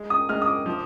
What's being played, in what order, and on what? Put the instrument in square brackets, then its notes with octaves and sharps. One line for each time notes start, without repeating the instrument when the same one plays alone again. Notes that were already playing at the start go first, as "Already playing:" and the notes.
Already playing: [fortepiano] G#3
[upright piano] D#6
[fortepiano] G#3 [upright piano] F6
[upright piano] D#6
D6
[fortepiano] F3